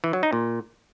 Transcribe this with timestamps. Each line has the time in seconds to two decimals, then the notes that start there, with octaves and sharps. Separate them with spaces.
0.04 E3
0.13 F#3
0.23 D#4
0.33 A#2